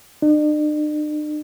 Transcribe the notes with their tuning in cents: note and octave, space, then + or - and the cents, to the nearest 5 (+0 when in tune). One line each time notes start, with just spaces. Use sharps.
D4 +45